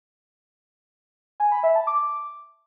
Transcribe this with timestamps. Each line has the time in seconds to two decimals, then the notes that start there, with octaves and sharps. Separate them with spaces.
1.40 G#5
1.51 B5
1.63 E5
1.75 A5
1.87 D6